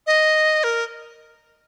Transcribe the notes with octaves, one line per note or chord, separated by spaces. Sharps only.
D#5
A#4